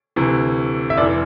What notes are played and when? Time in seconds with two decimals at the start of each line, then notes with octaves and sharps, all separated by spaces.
0.16 D2 C3 E3
0.90 E5
0.97 F1 E3 D5